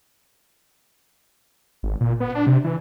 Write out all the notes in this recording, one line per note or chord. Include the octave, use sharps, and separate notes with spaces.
G#1
A#2
B3
D4
C3
E3